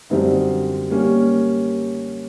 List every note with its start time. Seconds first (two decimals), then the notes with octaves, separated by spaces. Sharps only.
0.10 F#2 D3 G3 C4 D#4
0.90 G3 A#3 C#4